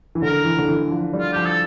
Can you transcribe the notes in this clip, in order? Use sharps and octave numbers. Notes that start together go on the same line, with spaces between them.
E3
D3 A#4
E3
D3
E3
F3
G3
F4
F3 G4
A4